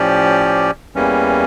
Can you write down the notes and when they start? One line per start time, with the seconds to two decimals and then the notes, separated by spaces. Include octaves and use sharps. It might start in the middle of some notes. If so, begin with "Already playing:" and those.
Already playing: A2 F3 C#4 G4 D5
0.95 E2 E3 G3 A#3 C#4